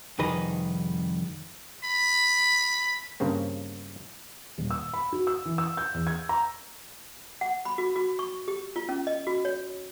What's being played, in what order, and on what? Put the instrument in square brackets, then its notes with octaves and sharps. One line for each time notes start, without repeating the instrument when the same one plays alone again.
[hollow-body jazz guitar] C2 F2 D#3 G#4 B4 D#5
[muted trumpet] B5
[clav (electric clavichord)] G2 C#3 A#3 C4
[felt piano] D#1
E6
B5
F#4
E6
E3
E6
G6
E2
G#6
A#5
[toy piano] F#5
B5
F#4
F#4
C#6
G4
F4
C#4
D#5
F#4
C#5